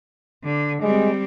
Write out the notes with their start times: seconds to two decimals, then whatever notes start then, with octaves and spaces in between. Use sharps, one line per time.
0.44 D3
0.82 G3 G#3 C4